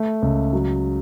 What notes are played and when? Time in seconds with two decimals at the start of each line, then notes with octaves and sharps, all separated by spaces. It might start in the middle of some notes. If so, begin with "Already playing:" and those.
Already playing: A3
0.22 C#2
0.53 F#3